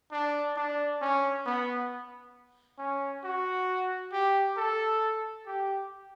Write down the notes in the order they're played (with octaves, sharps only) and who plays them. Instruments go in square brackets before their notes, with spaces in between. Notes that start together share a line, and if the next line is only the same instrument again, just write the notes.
[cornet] D4
D4
C#4
B3
C#4
F#4
G4
A4
G4